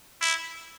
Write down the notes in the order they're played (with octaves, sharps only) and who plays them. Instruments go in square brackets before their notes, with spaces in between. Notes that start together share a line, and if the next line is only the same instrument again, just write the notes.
[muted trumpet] E4